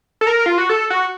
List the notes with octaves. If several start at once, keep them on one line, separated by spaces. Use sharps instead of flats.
A4
A#4
F4
F#4
A4
F#4